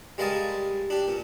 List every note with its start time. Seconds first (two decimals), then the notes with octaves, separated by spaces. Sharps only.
0.18 G3 G#3 A#4 F5 A5 D#6
0.90 D4 G4
1.08 A#2